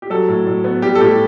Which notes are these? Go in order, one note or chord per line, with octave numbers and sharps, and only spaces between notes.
G4
F#3 A4
A2
A2
B3
G3 G4
A4
A2 G4